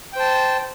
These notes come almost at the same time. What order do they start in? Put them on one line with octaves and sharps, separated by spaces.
G5 C5 A5